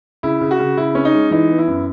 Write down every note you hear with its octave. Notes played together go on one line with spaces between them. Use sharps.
C#3 E4
C#3
F#4
C#3
C#3 E4
C#4
D#4
G#3
E3 D#4
B3
E4
F#2